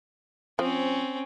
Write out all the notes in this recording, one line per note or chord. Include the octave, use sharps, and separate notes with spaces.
F3 C4 C#4